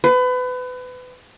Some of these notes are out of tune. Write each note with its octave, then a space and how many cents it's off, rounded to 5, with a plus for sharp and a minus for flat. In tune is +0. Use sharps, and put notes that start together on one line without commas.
B4 +30